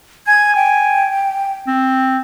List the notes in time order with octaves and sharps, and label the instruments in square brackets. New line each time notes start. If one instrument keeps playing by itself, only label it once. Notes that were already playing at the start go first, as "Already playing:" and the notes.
[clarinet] G#5 [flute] G#6
[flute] G5
[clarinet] C4